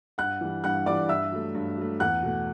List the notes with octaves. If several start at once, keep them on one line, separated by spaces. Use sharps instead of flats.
G2 F#5 F#6
E3 G3
G2 F#5 F#6
E3 G3 D5 D6
G2 E5 E6
F#3 A3
G2
F#3 A3
E2 F#5 F#6
B2 A3